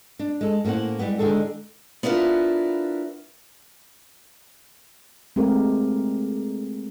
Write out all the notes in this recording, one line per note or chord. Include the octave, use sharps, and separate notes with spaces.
D4
G#3 A4
A2 A#3 C#4 C5 F#5
G3 G#3 B3
D3 D#3 G#3 G#4 A4
B3 D4 E4 F4 A#4
G#3 A3 C4 G4 A#4